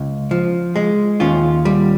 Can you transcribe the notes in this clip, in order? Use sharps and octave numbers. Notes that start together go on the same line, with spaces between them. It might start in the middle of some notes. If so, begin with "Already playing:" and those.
Already playing: C#2
F3
G#3
D#2 C#4 F4
G3